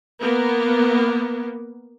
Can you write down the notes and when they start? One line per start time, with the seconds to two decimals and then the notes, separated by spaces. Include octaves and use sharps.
0.21 A#3 B3